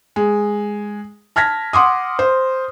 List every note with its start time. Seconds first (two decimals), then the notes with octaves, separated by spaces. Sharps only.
0.16 G#3
1.36 A5 F6 G#6 A#6 B6
1.73 F#5 C6 D6 D#6
2.19 C5